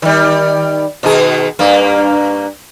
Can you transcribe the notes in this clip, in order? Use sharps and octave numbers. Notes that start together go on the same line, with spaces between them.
D#3 G3
B2 D#3 G#4
G2 A#3